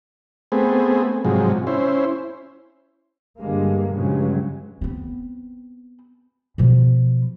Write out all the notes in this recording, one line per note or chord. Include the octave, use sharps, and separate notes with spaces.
A3 B3 C4 G#4
G#2 C3 F3 F#3 G#3
C#4 E4 C5
G2 D3 G3 G#3 A#3
G2 C#3 F3 F#3 G#3
B3 C4
B2 F3